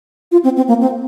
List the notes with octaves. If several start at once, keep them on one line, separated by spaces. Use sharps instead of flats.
F4
C4
C4
A#3
C4